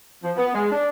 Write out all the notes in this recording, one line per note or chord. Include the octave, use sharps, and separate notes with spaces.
F3
B3
G#3
D4